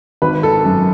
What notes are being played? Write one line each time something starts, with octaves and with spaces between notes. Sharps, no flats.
G#1 B4
A4
F#2